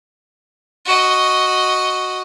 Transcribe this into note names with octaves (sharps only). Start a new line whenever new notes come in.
F#4 D#5